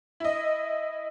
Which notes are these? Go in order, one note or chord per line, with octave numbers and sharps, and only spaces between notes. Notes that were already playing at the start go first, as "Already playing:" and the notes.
E4 D#5